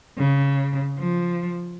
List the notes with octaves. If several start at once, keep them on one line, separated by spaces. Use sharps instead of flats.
C#3
F3